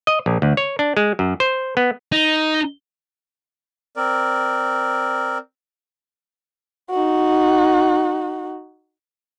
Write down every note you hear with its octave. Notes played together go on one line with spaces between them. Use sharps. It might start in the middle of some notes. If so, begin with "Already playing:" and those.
D#5
A#1
D2
C#5
D4
G#3
F#2
C5
B3
D#4
C4 A#4 D5
D#4 F#4